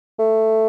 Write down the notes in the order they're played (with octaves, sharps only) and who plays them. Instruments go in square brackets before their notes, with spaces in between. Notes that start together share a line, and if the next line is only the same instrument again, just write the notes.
[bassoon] A3